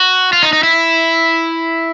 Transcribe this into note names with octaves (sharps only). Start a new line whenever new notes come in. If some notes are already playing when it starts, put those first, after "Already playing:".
Already playing: F#4
F4
D#4
D#4
E4